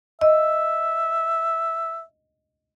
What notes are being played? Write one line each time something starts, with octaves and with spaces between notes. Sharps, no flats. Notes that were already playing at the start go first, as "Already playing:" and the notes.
D#5 E5